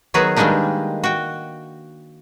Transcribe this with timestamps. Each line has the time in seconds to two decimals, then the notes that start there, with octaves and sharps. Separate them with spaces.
0.14 D#3 F#3 B3 F#4 G#4
0.36 D#3 G3 G#3 A#3 D4 D#4
1.04 F#4 G5